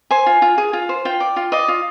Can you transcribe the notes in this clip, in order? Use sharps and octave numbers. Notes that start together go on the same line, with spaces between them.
C5 G#5
F4
F4
G#4
F4
C5
F4 G5
D5
F4
D5 D#5
F4